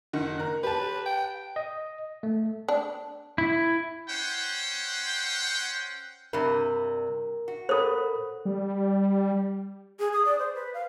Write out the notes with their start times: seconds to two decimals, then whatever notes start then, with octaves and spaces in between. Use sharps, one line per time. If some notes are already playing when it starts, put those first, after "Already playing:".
0.13 F#1 D#3 F#5
0.38 A#4 F#6
0.63 G4 B4 A5
1.06 G5
1.56 D#5
2.23 A3
2.69 D4
3.38 E4
4.09 C#4 C5 F#5 G5
6.33 G2 C3 A#4
7.48 F#4
7.69 A4 A#4 C5 B5
8.45 G3
9.99 G#4
10.13 D#6
10.25 D5
10.39 C5
10.55 B4
10.74 F5